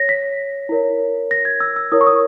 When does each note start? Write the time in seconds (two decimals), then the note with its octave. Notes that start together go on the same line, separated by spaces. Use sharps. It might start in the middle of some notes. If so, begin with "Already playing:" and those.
Already playing: C#5 A#6
0.09 B6
0.69 E4 A#4 C#5
1.31 A#6
1.45 G#6
1.60 E6
1.76 E6
1.92 E4 A#4 C#5 D#6
2.01 C#6
2.07 D#6